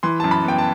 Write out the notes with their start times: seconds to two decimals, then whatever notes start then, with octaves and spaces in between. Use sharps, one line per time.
0.03 E3 C6
0.20 F#2 A5
0.31 B5
0.44 B3 G5
0.58 A5